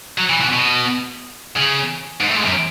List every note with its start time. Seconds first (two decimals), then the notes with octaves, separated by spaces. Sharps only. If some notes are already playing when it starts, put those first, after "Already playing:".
0.18 F#3
0.30 E3
0.41 B2
0.53 B2
1.57 C#3
2.20 G#2
2.27 A2
2.36 G#2
2.45 F#2